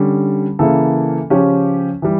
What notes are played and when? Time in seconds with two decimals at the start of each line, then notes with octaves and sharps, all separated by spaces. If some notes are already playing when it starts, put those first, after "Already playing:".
Already playing: D3 G3 C#4
0.59 C#3 E3 A#3 E4 A4
1.30 C#3 F3 C#4 G4 C#5
2.02 E3 G3